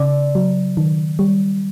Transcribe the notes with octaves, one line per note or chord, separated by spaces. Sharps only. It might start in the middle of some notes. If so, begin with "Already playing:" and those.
Already playing: C#3 D5
F#3
D#3
G3